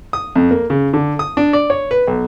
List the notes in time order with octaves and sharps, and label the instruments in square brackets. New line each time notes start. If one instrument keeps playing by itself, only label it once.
[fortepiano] D#6
F2
A#3
C#3
D3
D#6
D4
D5
C#5
B4
B1